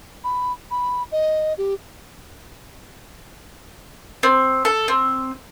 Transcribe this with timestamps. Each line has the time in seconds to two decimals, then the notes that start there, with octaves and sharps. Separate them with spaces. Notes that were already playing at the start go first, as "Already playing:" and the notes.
0.24 B5
0.71 B5
1.12 D#5
1.58 G4
4.23 C4
4.65 A4
4.88 C4